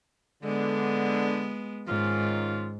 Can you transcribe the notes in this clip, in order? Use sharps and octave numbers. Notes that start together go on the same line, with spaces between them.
D3 G#3 B3
G#2 D#3 C#4 F4